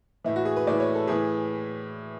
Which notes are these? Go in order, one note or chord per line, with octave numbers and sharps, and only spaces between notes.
A2 E3 E4
F#4
G#4
B4
A2 E3 D5
C#5
A4
A2 E3 G#4